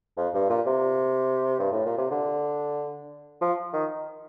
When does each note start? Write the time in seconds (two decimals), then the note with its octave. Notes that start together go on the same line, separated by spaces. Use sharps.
0.17 F2
0.34 G2
0.50 A#2
0.66 C3
1.59 G2
1.72 A2
1.86 A#2
1.98 C3
2.11 D3
3.41 F3
3.73 D#3